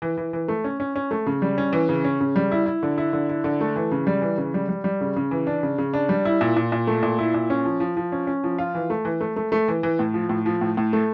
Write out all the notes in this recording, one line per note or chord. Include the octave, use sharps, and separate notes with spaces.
E3
E3
E3
A3
C#4
C#4
C#4
A3
C#3
G3
C#4
E3
C#3
C#4
C#3
G3
E4
E4
D3
E4
D3
E4
D3
A3
E3
C#3
G3
E3
C#3
G3
G3
G3
C#3
C#3
E3
D4
C#3
C#3
D4
G3
E4
A#2
A#2
A#2
A3
A#2
E4
A#2
C#4
F3
F3
F3
C#4
C#4
F3
F4
E3
A3
E3
A3
A3
A3
E3
E3
A2
F3
A2
F3
A2
A2
A3